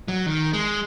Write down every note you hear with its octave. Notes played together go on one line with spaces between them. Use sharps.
F#3
D#3
G#3